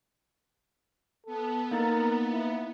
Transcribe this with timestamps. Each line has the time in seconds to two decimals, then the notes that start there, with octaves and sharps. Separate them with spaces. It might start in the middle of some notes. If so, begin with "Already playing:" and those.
1.26 B3 A4
1.71 A#3 D#4 A#4 A6
2.32 E4